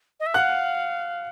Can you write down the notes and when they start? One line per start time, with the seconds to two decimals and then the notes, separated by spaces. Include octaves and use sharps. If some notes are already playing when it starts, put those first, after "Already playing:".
0.20 D#5
0.26 E5
0.34 F5 F#5 F#6